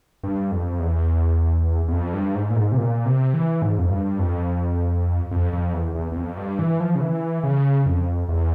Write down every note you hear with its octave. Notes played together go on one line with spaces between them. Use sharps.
G2
F2
E2
E2
F2
G2
G#2
A#2
G#2
C3
A#2
C3
E3
G#2
F2
G2
F2
F2
F2
E2
E2
E2
F2
G2
E3
F3
C#3
E3
C#3
F2
E2